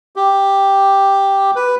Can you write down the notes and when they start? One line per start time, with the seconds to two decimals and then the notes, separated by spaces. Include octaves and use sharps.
0.16 G4
1.56 B4